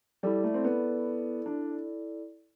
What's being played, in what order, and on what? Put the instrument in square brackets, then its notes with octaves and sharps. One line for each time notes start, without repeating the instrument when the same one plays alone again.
[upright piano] G3 [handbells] E4 A4 D5
[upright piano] A3
C4
B3
D4